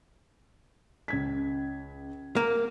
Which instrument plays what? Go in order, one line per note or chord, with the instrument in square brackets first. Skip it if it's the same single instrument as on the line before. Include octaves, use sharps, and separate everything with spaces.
[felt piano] C#2 G#6 B6
[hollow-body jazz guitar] A#3